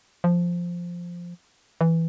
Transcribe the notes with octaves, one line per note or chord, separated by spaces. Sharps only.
F3
E3